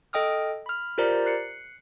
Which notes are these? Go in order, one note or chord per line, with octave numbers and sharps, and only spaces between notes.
A4 D#5 G5 D#6 F6
B5 F6
F4 G4 A#4 C5 D5 A#5
F#6 C7 C#7